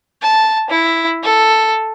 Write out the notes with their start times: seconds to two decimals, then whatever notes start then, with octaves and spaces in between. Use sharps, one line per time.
0.22 A5
0.70 E4
1.23 A4